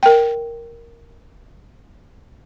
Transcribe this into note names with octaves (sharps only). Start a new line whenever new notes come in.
A#4 G5